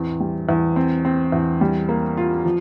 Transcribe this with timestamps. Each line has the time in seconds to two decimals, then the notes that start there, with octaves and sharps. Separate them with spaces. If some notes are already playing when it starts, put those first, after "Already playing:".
Already playing: E2 A2 C4
0.20 G3
0.49 E2
0.76 C4
1.05 C4
1.32 E2
1.61 G3
1.89 A#3
2.17 F4
2.45 F3